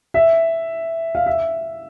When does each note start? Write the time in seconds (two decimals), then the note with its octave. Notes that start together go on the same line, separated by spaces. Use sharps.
0.14 E5
1.15 F5
1.26 E5